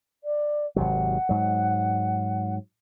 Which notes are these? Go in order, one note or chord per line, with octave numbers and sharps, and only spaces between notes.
D5
G#1 C3 F#3 F#5
G#2 F#3